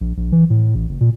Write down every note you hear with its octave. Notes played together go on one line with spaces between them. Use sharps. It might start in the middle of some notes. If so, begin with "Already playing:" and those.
A#1
A#1
E3
A2
A1
F#1
A#2